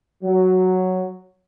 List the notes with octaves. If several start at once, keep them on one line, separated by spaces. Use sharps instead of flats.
F#3